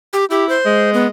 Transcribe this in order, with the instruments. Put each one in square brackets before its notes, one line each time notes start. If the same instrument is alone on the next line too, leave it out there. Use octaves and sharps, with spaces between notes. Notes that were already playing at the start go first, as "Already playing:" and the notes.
[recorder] G4
[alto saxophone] E4 [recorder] G4
[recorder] C5
[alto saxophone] G#3
[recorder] B3